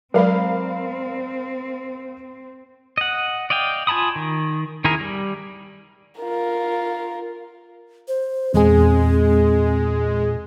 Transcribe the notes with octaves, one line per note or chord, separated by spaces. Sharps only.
F#3 G#3 C4 A#4 D5 F5 B5
D#5 F#5
D5 D#5 F5 G5
F4 G#5 A5 B5 D#6
D#3
D#3 E4 G#4 A#4
G3
F4 A#4
C5
E2 A#2 G#3 C4 G#4